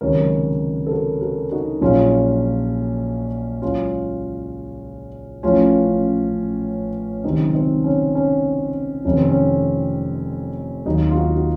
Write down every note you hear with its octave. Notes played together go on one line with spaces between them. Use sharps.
C#2 C3 D#3 F#3 A#4 C#5
A4
F#4 A#4
F#4 A#4
D#4 F#4
A#1 A#2 F#3 C#4 F4
C#2 C#3 F#3 C#4 F4
A1 A2 F3 C#4 F4
C#2 C3 D#3 F#3 C4 D#4
C4 D#4
C#4
C#4
F1 F2 D#3 C#4
C4
C#4
D#2 D#3 F#3 D#4 F#4
F4
D#4 F#4
F#4